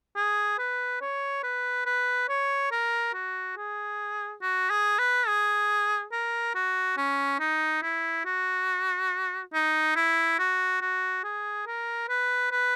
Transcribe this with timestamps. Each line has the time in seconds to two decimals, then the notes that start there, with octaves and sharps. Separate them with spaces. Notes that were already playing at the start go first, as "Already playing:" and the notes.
0.16 G#4
0.58 B4
1.01 C#5
1.43 B4
1.86 B4
2.28 C#5
2.72 A#4
3.14 F#4
3.57 G#4
4.42 F#4
4.70 G#4
4.99 B4
5.27 G#4
6.12 A#4
6.55 F#4
6.97 C#4
7.40 D#4
7.82 E4
8.25 F#4
9.53 D#4
9.96 E4
10.39 F#4
10.81 F#4
11.24 G#4
11.66 A#4
12.09 B4
12.51 B4